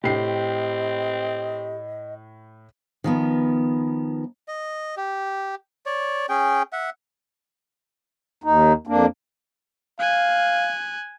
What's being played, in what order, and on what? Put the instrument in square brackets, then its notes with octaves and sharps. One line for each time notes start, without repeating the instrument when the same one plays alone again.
[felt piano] A2 C7 [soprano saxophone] C4 [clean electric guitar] G4 [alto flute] D#5
[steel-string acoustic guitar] D#3 F3 B3
[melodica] D#5
G4
C#5 D5
C#4 G#4 G5
E5 F#5
[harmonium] D#2 D#4
F2 A#3 D4
[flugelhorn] F5 [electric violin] G#5 F#6